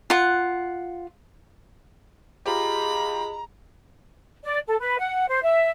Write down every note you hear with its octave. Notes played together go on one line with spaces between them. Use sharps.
F4 F#5
G#3 F4 G4 A#5 B5
D5
A4
B4
F#5
C5
E5